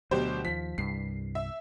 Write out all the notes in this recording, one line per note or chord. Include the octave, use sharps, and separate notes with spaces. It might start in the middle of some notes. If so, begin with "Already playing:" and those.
D2 B2 F#3 G4 C5
D#2 F3 B6
C2 G2 C7
E5